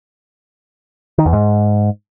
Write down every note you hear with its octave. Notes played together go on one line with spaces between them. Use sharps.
D#3
E2
G#2